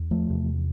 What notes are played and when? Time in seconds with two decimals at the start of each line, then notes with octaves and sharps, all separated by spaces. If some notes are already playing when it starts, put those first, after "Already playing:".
Already playing: E2
0.11 F3 A3
0.29 E2 C3